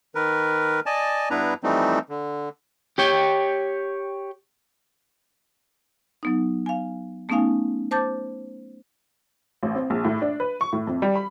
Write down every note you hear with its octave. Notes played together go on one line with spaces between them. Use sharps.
D#3 A#4 B4
D5 D#5 G#5 A5
G2 B3 D4 E4 B4 A#5
E3 F3 G3 A3 C4 D#4
D3
G4 C#5 G5
F#3 B3 D#4
F5 G#5
A3 B3 C#4 D#4 F5 G#5
C5 A5 D6 G6 A6
A1
C4
A#1
A2
D4
B4
C#6
A2
F2
G3
B5